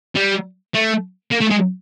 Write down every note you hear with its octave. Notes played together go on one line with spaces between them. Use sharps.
G3
A3
A#3
A3
G#3